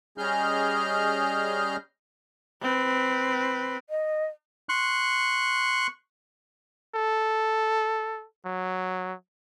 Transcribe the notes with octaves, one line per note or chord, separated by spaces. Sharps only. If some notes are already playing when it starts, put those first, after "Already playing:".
G3 C#4 G#4 D#5 F6 G6
C4 B4
D#5
C6 C#6 F#6
A4
F#3